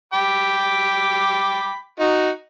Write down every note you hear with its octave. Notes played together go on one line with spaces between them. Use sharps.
G5 B5 D6
D#4 F#4